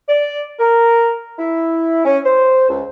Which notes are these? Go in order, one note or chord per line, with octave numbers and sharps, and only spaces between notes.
D5
A#4
E4
C#4
C5
C#2